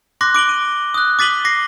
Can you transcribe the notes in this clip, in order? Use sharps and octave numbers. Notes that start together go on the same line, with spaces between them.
C6 D6 F#6 A#6
D6 D7 F#7 G7
D#7
D#6 F#6
D6 A6 B6 D#7 F#7 G7
D6 A#6 C7